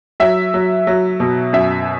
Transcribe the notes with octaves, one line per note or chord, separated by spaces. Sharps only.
F#3 E5
F#3
F#3
B2
F#2 E5